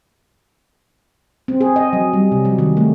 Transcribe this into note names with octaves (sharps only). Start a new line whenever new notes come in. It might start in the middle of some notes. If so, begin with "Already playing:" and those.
C4
G#4
D#5
F#3
G3
C3
F#3
D#3
A3